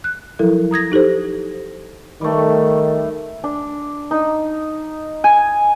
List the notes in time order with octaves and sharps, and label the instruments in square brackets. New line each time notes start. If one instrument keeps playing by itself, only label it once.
[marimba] F#6
F3 F#3 E4 A4 A#4
A#5 D#6 G#6 A#6
D#4 G4 A4 C5
[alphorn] D#3 [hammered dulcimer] G3 A3
[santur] D4
D#4
G#5